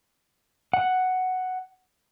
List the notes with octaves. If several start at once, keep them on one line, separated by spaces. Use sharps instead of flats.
F#5